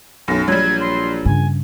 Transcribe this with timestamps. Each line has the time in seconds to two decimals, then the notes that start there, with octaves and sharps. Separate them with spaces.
0.28 B1 F#2 A#6
0.48 A#1 F#3 G3 G#6
0.80 C6
1.25 G2 C#3 G#5